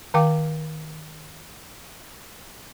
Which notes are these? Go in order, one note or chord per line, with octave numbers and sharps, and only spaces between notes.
D#3 F5 G5 D6